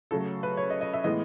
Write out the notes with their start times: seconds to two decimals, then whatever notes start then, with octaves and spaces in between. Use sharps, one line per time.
0.11 C#3 F#3 A3 A4
0.43 B4
0.57 C#5
0.70 D#5
0.81 D#5
0.94 E5
1.04 A2 E3 G#3 B3 D#5